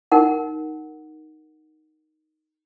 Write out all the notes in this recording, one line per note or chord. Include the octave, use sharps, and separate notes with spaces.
D#4 A#4 F#5